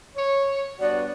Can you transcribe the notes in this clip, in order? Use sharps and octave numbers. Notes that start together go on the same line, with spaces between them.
C#5
G2 B3 F#4 D5